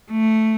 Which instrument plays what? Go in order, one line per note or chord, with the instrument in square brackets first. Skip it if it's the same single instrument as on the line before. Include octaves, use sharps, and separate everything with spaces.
[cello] A3